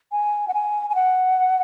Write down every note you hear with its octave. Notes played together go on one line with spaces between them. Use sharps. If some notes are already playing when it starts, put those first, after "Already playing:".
G#5
F#5
G#5
G#5
F#5